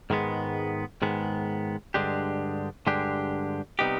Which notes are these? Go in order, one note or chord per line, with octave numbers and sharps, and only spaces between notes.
G#2 D#3 G#3 B3
G#2 D#3 G#3 B3
G2 D3 G#3 D4 G4
G2 D3 G#3 D4 G4
C3 G3 B3 D#4 G4